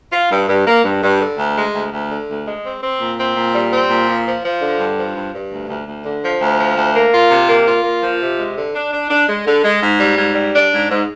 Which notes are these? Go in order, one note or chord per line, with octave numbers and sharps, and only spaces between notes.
F4
G2
G2
A#3
G2
G2
D3
D2
G#3
D2
D2
D3
D2
G#3
C4
C4
A#2
C4
A#2
G3
C4
A#2
F3
F3
F3
D3
G2
F3
G2
G2
D2
D2
D2
D3
F3
D2
F3
D2
A#3
F4
C3
A#3
F4
A#3
F3
C3
G#3
D3
D4
D4
D4
G#3
D3
G#3
G#2
G3
G#2
G3
D4
G#2
G#2